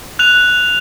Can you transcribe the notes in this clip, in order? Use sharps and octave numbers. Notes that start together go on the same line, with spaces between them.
F#6 F7